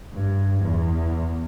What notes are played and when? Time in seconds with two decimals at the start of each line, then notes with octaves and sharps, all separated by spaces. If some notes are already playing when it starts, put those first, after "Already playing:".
0.14 G2
0.63 E2